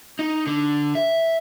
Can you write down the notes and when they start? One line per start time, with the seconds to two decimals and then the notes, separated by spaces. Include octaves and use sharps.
0.19 D#4
0.47 D3
0.95 E5